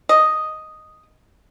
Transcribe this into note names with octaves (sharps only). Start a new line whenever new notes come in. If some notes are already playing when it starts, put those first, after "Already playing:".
D#5